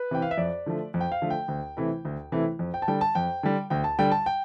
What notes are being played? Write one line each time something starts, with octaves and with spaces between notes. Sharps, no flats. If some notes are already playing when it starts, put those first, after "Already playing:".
Already playing: B4
C3 E3 G5
F5
E5
F2 D5
D3 F3 A3
F2
G5
F5
D3 F3 A3
G5
D2
C3 E3 A3 E4
D2
C3 E3 A3 E4
F2
G5
A5
D3 G3 G5
A5
F2 G5
D3 G3
D2 G5
A5
D3 G3 G5
A5
G5